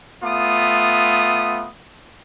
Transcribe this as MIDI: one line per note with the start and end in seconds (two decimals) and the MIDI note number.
0.23 1.69 57
0.23 1.69 59
0.23 1.69 65
0.23 1.69 87